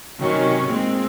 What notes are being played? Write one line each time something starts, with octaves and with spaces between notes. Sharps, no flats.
C3 D#3 F#3 C#4
A#2 G#3 C4